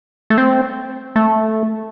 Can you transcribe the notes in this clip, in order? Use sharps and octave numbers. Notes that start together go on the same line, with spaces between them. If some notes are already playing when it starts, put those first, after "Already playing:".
A3
C4
A3